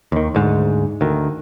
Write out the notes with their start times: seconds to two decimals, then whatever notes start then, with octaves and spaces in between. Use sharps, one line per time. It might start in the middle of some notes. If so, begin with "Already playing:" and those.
0.12 D#2 D#3
0.35 D2 G#2
1.01 D2 D#3